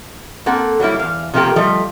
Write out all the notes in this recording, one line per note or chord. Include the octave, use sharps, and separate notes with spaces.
A#3 C4 A4 F#5
F#3 G3 A#3 E4
E2 F5
C3 F3 A3 A#3 G4
F3 G3 A3 D#5